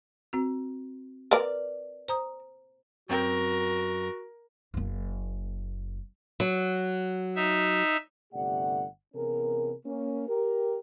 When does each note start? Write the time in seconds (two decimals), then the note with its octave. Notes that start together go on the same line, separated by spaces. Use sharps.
0.33 C4 F#4
1.31 A#4 B4 D5
2.08 C5 A#5 D#6
3.09 F#2 C4 F#4 A#4 G5
4.74 F#1 A#3
6.40 F#3
7.36 D#4 E5
8.33 G1 C3 A3 G4 D5 F#5
9.14 C3 E3 B3 C#4 G#4 A#4
9.86 A#3 C#4
10.28 G4 A#4